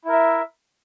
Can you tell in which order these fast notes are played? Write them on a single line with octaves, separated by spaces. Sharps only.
E4 A#4 E5